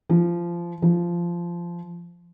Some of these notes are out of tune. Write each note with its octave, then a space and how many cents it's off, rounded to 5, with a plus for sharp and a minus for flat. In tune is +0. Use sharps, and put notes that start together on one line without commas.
F3 -20
F3 -15